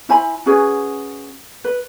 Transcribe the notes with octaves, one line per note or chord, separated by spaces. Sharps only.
E4 C5 G#5 B5
C#4 F#4 G#4 B4
B4